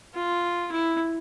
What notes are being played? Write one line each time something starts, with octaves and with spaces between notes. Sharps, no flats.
F4
E4